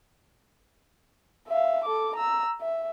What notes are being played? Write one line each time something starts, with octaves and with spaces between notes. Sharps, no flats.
E5 F5
A4 D6
A#5 E6
E5